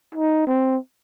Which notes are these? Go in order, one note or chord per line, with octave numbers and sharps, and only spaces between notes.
D#4
C4